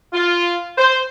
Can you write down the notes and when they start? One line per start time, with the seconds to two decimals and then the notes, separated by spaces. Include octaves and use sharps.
0.13 F4
0.78 C5